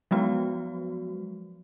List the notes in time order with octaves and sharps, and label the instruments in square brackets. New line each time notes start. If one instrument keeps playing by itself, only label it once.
[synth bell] F3 F#3 G#3 B3 F#4